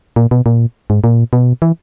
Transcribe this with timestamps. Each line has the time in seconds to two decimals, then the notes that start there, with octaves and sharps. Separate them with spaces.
0.16 A#2
0.31 B2
0.46 A#2
0.90 G#2
1.04 A#2
1.33 B2
1.62 E3